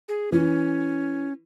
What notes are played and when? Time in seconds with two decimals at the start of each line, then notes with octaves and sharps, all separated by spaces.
0.08 G#4
0.32 E3 C#4